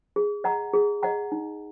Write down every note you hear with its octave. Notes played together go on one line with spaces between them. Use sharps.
G#4
D#5 F#5 A#5
G#4
D#5 F#5 A#5
D#4